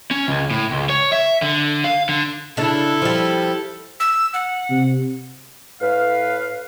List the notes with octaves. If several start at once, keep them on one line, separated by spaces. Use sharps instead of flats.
C#4
C#2
A2
C#2
C#5
E5
D3
F5
D3
C#3 D4 E4 A4
F3 G3
E6
F#5
C3
A2 B4 F5